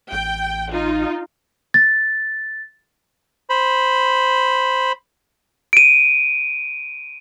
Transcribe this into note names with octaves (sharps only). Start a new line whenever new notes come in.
A1 G5
D#4 F4
A6
C5 B5
D7 D#7